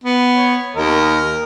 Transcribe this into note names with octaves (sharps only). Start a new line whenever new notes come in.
B3
C#5
D#2 A#4 D#5